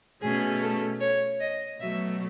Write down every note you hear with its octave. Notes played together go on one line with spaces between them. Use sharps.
B2 A3 C#4 G#4
A4
C#5
D#5
B2 F#3 A3 E5